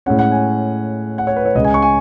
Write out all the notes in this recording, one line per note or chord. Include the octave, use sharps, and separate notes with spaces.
A2 G#3 C#4 F#5
F#5
G#5
F#5
C#5
B4
C#5
C#2 C#3 G#3 D#5
G#5
C#6
G#5